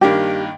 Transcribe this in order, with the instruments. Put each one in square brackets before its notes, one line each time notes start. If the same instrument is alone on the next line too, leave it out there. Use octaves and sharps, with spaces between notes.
[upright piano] G2 D#3 A#3 D4 [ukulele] G4